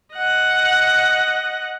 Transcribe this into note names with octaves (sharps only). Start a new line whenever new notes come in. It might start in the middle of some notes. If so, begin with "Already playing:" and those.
D#5 F#5